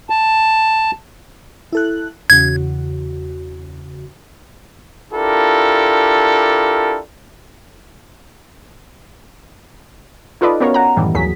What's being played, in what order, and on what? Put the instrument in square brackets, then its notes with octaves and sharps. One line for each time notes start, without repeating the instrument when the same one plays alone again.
[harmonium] A5
[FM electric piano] E4 A4 F#6
[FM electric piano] E2 C#3 F#4 [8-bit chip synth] G#6
[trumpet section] D4 E4 F4 G4 A4 A#4
[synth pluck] D#4 F4 A4 B4 D5 D#5
B3 C#4 F#4 A#4 C#5 F5
F#5 A#5
F#2 A2 D#3 E3 G3
G#1 D#2 F#3 G#4 B6